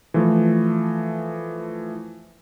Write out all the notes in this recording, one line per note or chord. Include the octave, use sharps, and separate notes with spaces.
E3 F3 A3